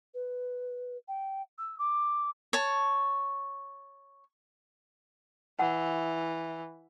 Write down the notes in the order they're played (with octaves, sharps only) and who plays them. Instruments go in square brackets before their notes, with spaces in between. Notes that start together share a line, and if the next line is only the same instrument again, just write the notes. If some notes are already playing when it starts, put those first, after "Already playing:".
[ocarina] B4
G5
E6
D6
[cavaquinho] C#5 A5
[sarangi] E3 [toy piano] F#5